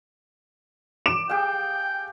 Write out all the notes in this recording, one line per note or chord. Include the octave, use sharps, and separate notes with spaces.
D6 D7 E7
G4 G#4 F5 G5